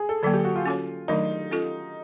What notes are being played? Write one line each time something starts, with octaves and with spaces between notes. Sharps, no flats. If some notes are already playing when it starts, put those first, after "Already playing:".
Already playing: G#4
A4
D3 F#3 A#3 A4
G4
F#4
F4
C#4 F#4 A4 C#5
D#3 F#3 A3 D4 D#4
C#4 F4 A4